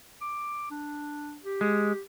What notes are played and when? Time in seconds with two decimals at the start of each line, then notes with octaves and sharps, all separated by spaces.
0.21 D6
0.71 D4
1.44 G4
1.61 G#3